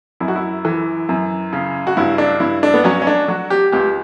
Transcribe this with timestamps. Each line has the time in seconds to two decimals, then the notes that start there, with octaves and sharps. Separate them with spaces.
0.20 F#2 E4
0.28 F#4
0.36 E4
0.65 E3
1.09 F#2
1.53 C#3
1.87 F#4
1.97 G2 E4
2.18 D4
2.40 G2 E4
2.63 D4
2.74 B3
2.84 F#3 C#4
3.02 C#4
3.07 D4
3.28 F#3 F#4
3.50 G4
3.72 C#2 G4